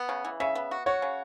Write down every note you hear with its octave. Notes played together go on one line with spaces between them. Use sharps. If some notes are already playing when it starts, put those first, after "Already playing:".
Already playing: B3
C#3
E3
C#3 E5
B3
F#4
F#4 C#5
C#3